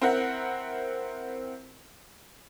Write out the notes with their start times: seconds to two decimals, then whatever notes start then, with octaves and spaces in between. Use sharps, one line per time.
0.02 C4 E4 A#4 F#5